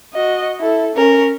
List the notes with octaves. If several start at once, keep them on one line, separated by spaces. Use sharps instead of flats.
F#4 D#5
E4 A4
C#4 A#4